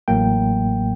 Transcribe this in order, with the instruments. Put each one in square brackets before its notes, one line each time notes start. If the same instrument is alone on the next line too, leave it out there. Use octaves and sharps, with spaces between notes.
[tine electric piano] A1 A2 F#3 A#3 G5